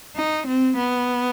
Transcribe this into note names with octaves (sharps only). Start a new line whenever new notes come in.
D#4
C4
B3